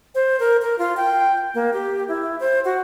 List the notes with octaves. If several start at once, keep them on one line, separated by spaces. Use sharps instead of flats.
C5
A#4
A#4
F4
G5
A#3
G4
E4
C5
F#4